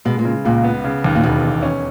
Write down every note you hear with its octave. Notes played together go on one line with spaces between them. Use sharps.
B2 G#3
A#2
C#3
C#2 A#2
B3
C#3
D#2
A#2
E1 B2
E1
C#4